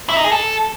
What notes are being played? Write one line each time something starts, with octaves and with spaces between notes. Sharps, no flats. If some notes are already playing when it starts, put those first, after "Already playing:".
E4
D#4
G#4
A4